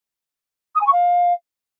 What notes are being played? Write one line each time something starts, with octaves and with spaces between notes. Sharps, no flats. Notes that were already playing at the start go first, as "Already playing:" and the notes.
D#6
G#5
C#6
F5